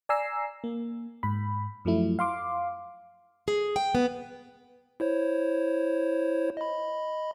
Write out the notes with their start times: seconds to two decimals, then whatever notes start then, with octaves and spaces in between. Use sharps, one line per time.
0.09 D5 G#5 A#5 E6 C7
0.64 A#3
1.23 G#2 B5
1.85 F#2 F3 F#3 A3 E4
2.19 F5 C6 D6
3.48 G#4
3.76 G5
3.95 B3
5.00 E4 C5 C#5
6.57 D#5 B5